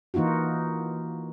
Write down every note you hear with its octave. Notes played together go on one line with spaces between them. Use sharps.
E3 A#3 D#4 F4 F#4